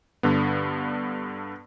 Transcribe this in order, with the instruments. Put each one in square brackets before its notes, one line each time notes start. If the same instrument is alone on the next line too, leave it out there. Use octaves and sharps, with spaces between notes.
[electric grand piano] G2 D3 B3